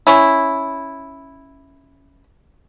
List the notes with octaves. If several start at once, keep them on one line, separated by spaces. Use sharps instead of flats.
C#4 E4